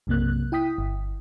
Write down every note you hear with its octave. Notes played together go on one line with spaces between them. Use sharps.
B1 F#2 C3 A#3 F#6
E4 G5 D#6 B6
G1